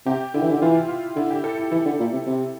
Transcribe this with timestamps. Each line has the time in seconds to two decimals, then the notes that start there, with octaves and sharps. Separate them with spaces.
0.06 C3 G4
0.34 D3 E4
0.42 E3
0.51 D3
0.62 E3 F4
0.75 E4
0.88 F4
1.16 D3 E4
1.30 G4
1.44 A4
1.57 E4
1.71 E3 E4
1.85 D3
1.99 A#2
2.13 C3
2.27 C3